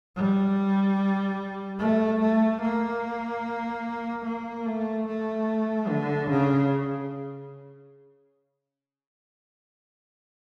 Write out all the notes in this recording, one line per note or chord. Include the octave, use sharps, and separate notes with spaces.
G3
A3
A3
A#3
A#3
A3
A3
D3
C#3